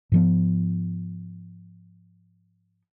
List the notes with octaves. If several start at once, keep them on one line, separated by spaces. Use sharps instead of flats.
G#2 F3 B3